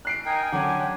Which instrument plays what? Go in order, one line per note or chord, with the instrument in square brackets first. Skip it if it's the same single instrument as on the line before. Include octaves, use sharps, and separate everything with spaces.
[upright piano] F#6 C7 D7
[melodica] D#4 A#4 [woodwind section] G5 G#5
[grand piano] D3 F#3 C#4 [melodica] D4 G4 [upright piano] F#5 A#5